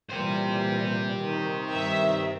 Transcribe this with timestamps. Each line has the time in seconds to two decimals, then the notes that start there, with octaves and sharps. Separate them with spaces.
0.10 A#2 E3 G3 G4 C5
1.09 D#3
1.71 G2 E5